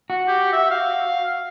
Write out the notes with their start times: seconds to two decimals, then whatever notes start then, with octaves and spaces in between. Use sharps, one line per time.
0.10 F#4
0.28 G4
0.53 E5
0.71 F5